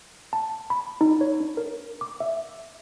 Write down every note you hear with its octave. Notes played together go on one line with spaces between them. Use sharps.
A5
B5
D#4
C#5
D4
A#4
D6
E5